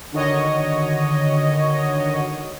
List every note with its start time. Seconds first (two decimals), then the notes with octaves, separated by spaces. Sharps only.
0.12 D3 D#3 F#4 C#5 D#5